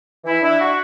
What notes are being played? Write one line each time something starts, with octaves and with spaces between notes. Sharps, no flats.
E3 E4
D4 E4
F#4